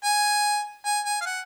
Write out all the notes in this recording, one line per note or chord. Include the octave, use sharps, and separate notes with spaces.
G#5
G#5
G#5
F5
F#5